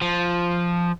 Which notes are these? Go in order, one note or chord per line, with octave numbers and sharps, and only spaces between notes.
F3